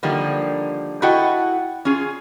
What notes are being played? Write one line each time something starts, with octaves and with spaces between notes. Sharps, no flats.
D3 D#3 F3 G3 A#3
E4 F#4 A4 D#5 F#5 G5
C#4 F4 G#4